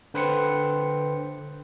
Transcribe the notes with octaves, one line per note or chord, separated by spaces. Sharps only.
D3 B4 C5 G5 C#7